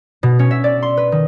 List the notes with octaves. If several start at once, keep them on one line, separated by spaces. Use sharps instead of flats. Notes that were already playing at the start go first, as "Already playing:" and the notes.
B2
C#4
E5
D5
C6
B4
D#3